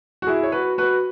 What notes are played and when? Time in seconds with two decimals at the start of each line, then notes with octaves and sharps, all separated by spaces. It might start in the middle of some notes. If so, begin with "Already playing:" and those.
0.22 F#4
0.27 E4 G#4
0.43 C#5
0.52 F#4 B4
0.78 F#4 B4